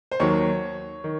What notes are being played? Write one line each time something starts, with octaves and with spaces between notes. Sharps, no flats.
C5
D#2 D#3 F#3 C#5
D#3